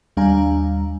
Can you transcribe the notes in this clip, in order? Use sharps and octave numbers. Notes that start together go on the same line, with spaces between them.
D#2 G3 D4 F5 G#5 A#5